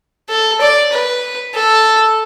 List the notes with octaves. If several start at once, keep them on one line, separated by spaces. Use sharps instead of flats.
A4
D5
B4
A4